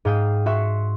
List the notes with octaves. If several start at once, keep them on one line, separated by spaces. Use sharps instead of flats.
G#2 F5 G5 D#6
F#4 E5 C6 C#6